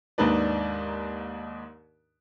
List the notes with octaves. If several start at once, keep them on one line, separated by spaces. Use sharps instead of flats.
D#2 G#2 D4 D#4 B4 D5